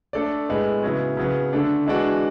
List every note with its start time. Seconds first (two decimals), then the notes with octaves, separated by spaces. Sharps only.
0.13 A3 D4 A4 D5
0.49 A2 G#3 B3
0.83 C#3 F#3 B3 E4
1.17 C#3 F#3 B3
1.53 D3 A3 D4
1.86 E3 G#3 D4 F#4